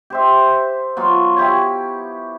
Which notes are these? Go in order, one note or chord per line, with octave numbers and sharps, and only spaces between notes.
G4 C5 E5
F#3 B3 F4
E4 G4 C#5